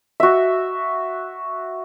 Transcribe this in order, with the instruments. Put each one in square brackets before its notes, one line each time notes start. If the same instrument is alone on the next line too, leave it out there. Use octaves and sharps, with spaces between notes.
[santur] F#4 E5